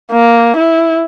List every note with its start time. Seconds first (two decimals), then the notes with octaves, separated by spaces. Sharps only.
0.12 A#3
0.57 E4